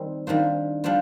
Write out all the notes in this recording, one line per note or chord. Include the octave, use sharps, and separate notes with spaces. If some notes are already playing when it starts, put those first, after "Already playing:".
Already playing: D#3 G3 C4
D#3 G3 D4 F4 C5
G3 D4 F4 C5